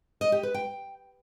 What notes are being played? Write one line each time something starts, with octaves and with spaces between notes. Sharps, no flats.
D#5
G4
B4
G5